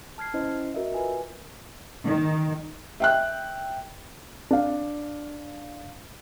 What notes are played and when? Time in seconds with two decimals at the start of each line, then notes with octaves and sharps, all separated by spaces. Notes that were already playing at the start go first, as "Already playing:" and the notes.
0.18 A5 F6 G#6 C7
0.34 C#4 E4 C5 D#5
0.74 F#4 A#4 D#5 E5
0.94 F4 B4 G#5
2.05 D#3
3.00 E5 G5 F#6
4.51 D4 F5